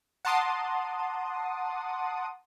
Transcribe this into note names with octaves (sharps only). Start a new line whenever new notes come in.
F#5 A5 A#5 C6 D6 D#6